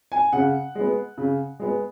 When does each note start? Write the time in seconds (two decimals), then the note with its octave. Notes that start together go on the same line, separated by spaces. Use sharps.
0.12 G#5
0.33 C#3 F#5
0.75 G#3 B3
1.18 C#3
1.60 G#3 B3